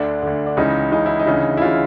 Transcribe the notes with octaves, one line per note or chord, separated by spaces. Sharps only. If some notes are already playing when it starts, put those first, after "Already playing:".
Already playing: D2 D3 D4
D2 D3
D4
C#2 C#3 E3 D#4
C#2 C#3 E3 D#4
E4
D#4
D2 C#3 E3
E4
C#3 E3 F4